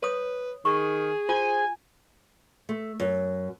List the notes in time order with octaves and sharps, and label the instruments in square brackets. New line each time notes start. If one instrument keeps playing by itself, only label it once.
[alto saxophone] B4 [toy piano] C#5 D#6
[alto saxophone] D#3 [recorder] G#4 [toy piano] C#6
[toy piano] F4 [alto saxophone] C5 [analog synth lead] G#5
[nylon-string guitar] A3
F#2